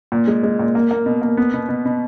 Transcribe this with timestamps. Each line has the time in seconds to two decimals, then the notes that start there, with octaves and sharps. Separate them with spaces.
0.12 A#2
0.27 G#3
0.43 G#3
0.59 A#2
0.75 A#3
0.91 A#3
1.06 B2
1.22 A#3
1.37 B3
1.54 B2
1.69 B2
1.85 B2